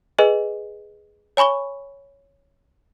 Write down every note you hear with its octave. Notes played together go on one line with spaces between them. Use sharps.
G#4 B4 D#5 G#5
C#5 G#5 B5 C#6 G7